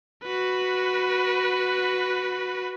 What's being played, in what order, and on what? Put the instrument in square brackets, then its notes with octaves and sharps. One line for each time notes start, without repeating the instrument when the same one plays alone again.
[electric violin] F#4 B4